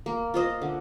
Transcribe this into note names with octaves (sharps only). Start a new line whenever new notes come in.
A#3
F4 C5 D#5
D3